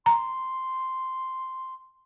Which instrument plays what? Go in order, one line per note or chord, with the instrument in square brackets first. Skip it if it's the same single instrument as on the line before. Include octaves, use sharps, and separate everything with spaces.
[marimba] A#5 [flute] C6